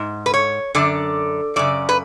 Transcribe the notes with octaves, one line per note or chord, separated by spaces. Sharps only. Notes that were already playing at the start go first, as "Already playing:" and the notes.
Already playing: G#2
B4
C#5
F#2 D3 D5
F#2 C#3 D5
B4